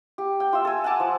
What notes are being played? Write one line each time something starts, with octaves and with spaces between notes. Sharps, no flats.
G4
G5
F4 E5
A4 G#5
F#5 G#5 A5 D6
F3